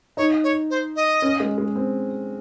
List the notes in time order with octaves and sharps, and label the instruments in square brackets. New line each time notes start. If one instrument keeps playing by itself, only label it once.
[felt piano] D#4 [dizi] C#5
[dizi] C#5
C5
D#5
[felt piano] C#4
G#3
G#3
C4